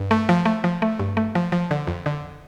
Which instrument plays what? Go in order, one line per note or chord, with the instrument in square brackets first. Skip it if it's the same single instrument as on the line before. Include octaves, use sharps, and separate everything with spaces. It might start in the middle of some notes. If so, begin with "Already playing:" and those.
Already playing: [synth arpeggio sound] G2
A3
F3
A3
F3
A3
G2
A3
F3
F3
D3
F2
D3